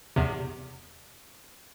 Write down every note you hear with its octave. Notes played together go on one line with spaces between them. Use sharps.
E2 C3